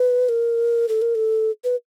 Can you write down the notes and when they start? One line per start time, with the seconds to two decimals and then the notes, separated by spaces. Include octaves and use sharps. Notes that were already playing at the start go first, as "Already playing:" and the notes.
Already playing: B4
0.29 A#4
0.89 A4
1.02 A#4
1.15 A4
1.64 B4